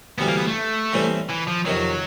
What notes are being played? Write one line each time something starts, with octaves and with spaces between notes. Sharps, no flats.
D2 C3 E3 G3 B3
A#3
B3
A3
A2 E3 G3 C4
E3
F3
F2 C3 D#3 F#3